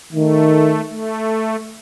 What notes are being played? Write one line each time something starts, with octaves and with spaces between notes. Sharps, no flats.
D#3 A3
A3